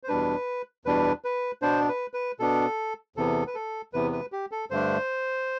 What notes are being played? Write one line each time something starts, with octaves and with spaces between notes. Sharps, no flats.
C5
E2 B2 G3 D4 B4
E2 B2 G3 D4 B4
B4
B2 B3 D4 C5
B4
B4
B2 B3 D4 A4
E2 C3 E3 B3 A4
B4
A4
E2 C3 E3 B3 B4
B4
G4
A4
G2 D3 A3 D4 C5